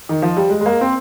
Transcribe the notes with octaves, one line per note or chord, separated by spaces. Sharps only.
D#3
F3
G3
G#3
G#3
A#3
C4